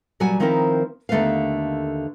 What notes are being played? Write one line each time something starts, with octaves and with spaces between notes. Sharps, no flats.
A#2 F#3 G3 F#4 D5 G#5
D#3 F3 C4 D#4 E4 A#4
D#2 D3 A3 B3 B4 F5